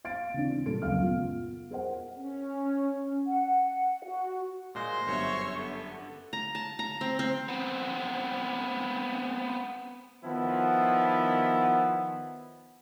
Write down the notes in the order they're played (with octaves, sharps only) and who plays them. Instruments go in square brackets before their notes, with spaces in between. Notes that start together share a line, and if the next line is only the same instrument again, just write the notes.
[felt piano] F5 A6 D7
C#3 E3 C4 D4
A#2 G3 A4 D7
D#1 C#2 F#2 C#3 F5 F6
B3 F4
G#4 A#4 C5 F#5
[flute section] C#4
F#5
F#4
[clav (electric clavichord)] A#2 G#3 [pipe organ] C5 C6 A#6
[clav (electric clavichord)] G1 F#2 [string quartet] C#5 E5 C#6
[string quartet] D3 [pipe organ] B3
[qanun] A#5
A5
A#5
C4
C4
[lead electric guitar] B3 C4
[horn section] D#3 F3 B3 E4